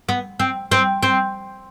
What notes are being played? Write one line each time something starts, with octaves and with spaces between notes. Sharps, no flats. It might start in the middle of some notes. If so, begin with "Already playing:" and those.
B3
C4
C4
C4